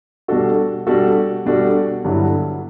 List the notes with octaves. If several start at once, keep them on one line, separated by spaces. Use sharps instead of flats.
B2 G3 D4 F#4 A4
B2 G3 D4 F#4 A4
B2 G3 D4 F#4 A4
G2 D3 F#3 B3 E4